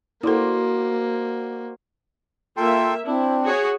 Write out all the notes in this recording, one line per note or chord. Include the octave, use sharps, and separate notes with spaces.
A#3 E4 F#4 A4 C5 D5
A#3 F4 A4 E5 G5 C6
C4 D4 E4
F#4 G#4 C#5